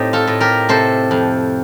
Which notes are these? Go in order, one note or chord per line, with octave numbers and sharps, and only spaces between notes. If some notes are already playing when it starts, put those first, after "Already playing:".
Already playing: A2 C4 D#4 G4
F4 A4
A2
G4 A#4
C3 A4 C5
F2